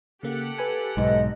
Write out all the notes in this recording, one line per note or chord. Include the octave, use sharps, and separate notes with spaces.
C#3 A#3 G4 A4 F#5
B4 G#5
B1 G#2 D#5